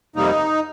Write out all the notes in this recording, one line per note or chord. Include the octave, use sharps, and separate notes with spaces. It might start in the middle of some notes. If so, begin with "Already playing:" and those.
F2 C3 G3 A#3 D#4